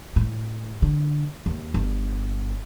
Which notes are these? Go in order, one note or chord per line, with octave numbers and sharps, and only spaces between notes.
A2
D3
D#2
G1